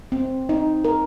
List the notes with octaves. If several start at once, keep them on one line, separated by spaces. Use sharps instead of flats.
C4
D#4
A#4